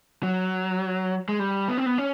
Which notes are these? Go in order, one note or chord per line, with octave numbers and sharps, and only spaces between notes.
F#3
G#3
G3
B3
C4
B3
C#4